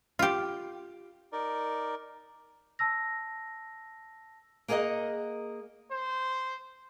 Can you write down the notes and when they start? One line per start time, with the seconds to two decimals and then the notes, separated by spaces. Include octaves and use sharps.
0.19 F4 G4
1.33 D#4 A#4 D5
2.79 A5 E6 A#6
4.68 A#3 G#4 A#4 C#5 D#5 F#5
5.92 C5